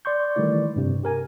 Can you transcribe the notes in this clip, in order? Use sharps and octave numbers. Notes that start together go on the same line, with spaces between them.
D5 C6 C#6 G6
D#3 E3 G3 A3 E4 D5
G2 C3
G4 A#4 G#5